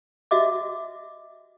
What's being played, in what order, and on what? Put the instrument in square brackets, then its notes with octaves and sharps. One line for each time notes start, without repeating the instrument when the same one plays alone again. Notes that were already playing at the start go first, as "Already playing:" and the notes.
[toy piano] F#4 D#5 E5 D6